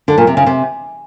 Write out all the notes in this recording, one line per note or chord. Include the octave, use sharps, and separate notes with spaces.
D3
A#2
C3
C#3
C3